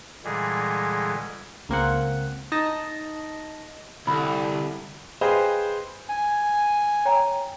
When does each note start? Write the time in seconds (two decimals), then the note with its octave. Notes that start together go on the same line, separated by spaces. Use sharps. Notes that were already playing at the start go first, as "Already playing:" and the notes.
0.24 A#2 D3 E3 G3 G#3 G#4
1.69 C#2 A#3 C4 F#5
2.52 D#4 D#5 A5 A#6
4.07 C2 D3 B5
5.21 G#4 B4 C5 D#5 F5 G5
6.09 G#5
7.05 C#5 G5 A#5